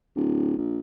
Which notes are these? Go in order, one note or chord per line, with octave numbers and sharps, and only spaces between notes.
D1
A#1